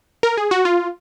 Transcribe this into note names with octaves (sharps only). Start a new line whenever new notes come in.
A#4
G#4
F#4
F4